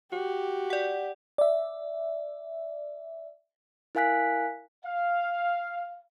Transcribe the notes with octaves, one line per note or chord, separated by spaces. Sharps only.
F#4 G4
D5 F#5
D5 E5
E4 A#4 F5 G#5 F#6 B6
F5